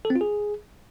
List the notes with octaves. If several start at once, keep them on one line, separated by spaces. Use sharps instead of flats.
A4
C4
F4
G#4